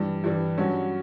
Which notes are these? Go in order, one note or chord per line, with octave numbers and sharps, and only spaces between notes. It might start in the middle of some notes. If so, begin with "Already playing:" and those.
Already playing: G2 E3 G3
G2 E3 G3
G2 F#3 C#4 F#4